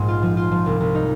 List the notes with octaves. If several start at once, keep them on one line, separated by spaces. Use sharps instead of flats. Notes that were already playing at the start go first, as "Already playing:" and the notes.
Already playing: A#1 G#2
F4
F3
F4
F3
C2
C2
D#4